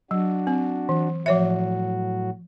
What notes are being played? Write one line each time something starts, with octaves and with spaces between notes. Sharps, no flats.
F#3 D4 F#4
C4
E3
A2 F3 F#3 F#4 C#5 E5